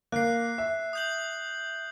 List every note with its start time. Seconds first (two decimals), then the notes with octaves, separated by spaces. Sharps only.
0.12 A#3 F#6 C7
0.58 E5
0.93 D#6 G6 F#7